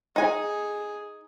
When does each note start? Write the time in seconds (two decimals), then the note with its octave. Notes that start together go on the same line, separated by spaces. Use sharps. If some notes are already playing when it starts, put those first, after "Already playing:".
0.16 D#4 G#4 G#5